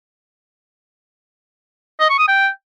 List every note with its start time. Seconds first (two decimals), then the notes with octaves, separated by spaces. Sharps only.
2.00 D#5
2.09 C#6
2.19 D#6
2.28 G5